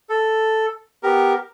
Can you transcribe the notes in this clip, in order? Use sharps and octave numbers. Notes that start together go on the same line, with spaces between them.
A4
B3 G4 A#4